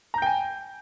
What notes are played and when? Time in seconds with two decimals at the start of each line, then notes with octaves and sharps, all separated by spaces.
0.14 A#5
0.18 G6
0.22 G5
0.26 G#5